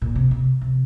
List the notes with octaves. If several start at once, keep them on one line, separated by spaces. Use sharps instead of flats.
A#2
C3
C3
C3